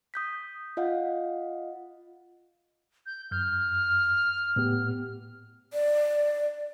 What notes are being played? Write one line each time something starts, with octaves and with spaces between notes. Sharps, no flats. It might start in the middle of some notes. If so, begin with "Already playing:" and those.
D#6 G6 B6
F4 D#5 F5 F#5
G6
F#2 F6 G6
A2 B3 G4
D5